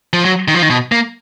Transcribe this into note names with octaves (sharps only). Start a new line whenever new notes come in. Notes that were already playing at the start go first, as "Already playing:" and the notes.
F3
F#3
D#3
F3
D#3
B2
A#3